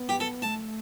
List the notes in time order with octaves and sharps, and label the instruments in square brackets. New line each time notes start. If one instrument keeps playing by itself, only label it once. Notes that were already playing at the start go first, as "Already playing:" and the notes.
Already playing: [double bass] B3
[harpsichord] G4
A4
[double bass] A3 [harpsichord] A5